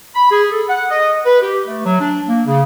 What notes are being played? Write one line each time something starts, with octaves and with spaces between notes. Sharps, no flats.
B5
G#4
A4
F#5
D#5
B4
G4
A3
F#3
D4
A#3
C#3